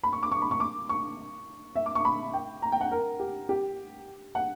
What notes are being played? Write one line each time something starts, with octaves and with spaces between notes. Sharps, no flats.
B5
C#6
D6
C#6
B5
C#6
D6
C#6
E5
D6
C#6
B5
G5
A#5
G5
F#5
A#4
G4
G4
F#5